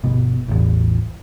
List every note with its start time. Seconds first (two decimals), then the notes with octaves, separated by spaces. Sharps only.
0.04 G1 B2
0.48 A1 E2